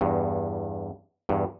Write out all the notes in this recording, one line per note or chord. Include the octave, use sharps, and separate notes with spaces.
E2 G2
E2 G2